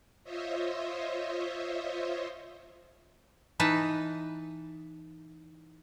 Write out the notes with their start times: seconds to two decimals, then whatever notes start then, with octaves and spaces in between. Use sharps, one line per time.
0.24 F4 C5 C#5 D#5 E5
3.60 E3 D#4 B4 A5